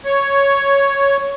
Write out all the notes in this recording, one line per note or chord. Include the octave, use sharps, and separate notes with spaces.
C#5